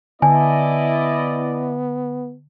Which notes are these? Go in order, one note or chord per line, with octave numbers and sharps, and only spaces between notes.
D3 B3 E4 D5 D#5 G#5